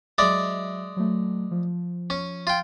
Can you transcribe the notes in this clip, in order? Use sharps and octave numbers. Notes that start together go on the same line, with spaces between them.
F#3 G#3 D5 E5
F#3 A3
F3
C#4
F4 G5